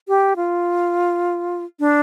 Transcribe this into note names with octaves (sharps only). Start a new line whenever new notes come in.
G4
F4
D4